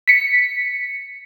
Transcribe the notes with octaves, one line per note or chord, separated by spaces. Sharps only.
B6 C#7